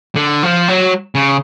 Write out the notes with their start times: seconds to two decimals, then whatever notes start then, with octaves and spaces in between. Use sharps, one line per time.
0.16 D3
0.43 F3
0.68 F#3
1.15 C#3